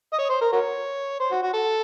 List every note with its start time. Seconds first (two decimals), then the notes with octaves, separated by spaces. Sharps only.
0.13 D#5
0.18 C#5
0.29 C5
0.41 A#4
0.52 F#4 A#4 C#5
1.20 C5
1.31 F#4
1.42 F#4
1.53 A4